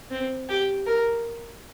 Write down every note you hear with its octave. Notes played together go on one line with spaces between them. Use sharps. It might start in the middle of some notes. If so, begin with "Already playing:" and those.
C4
G4
A#4